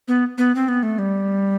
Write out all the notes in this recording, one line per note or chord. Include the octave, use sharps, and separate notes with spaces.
B3
B3
C4
B3
A3
G3